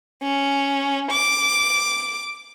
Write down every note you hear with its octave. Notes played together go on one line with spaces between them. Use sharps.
C#4
D6